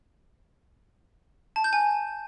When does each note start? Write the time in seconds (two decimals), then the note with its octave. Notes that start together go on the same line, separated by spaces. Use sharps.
1.56 A5
1.64 G6
1.73 G#5